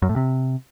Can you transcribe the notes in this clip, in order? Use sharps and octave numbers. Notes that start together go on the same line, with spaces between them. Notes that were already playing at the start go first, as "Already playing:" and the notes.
F#2
A2
C3